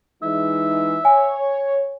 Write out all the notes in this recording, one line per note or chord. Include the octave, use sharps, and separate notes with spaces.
E3 G#3 D#4 E5
C#5 G#5